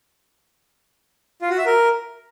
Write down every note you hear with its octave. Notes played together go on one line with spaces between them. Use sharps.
F4
F#4
E5
A#4